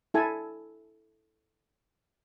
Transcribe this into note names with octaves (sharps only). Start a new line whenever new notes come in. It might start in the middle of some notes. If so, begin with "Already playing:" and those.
E4 A4 G#5